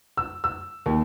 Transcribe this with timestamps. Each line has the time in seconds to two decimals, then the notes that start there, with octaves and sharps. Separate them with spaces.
0.17 E6
0.44 E6
0.86 D#2